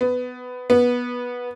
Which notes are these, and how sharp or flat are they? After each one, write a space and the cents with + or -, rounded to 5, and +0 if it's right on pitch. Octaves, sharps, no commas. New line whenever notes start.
B3 +15
B3 -15